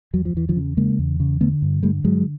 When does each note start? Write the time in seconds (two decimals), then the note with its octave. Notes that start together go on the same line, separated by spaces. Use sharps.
0.13 E2 F#3
0.25 F3
0.34 E2 E3
0.49 D#3 F3
0.56 C#3
0.77 C#3 G#3 A#3
0.99 E2
1.20 C#3
1.41 D3 A3 B3
1.62 G2
1.83 D3 G3 A3
2.04 G2 F#3 G#3